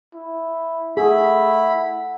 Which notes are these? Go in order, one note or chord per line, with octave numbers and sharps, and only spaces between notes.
E4
A3 E4 G#4 F#5 B5